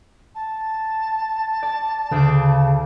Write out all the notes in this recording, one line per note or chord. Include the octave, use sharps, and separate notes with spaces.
A5
D5 A6
D2 C#3 D6